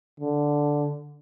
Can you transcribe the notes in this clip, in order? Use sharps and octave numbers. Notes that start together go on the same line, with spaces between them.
D3